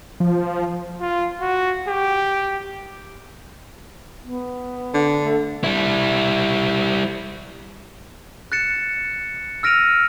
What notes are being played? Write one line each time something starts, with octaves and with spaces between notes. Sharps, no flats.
F3
F4
F#4
G4
B3
D3
A3
G3 E4
F#6 A6 C#7 E7
E6 F6 A#6 D7 D#7 F7